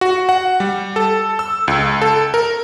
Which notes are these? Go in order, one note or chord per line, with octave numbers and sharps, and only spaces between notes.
F#4
F#5
G3
A4
E6
C#2
A4
A#4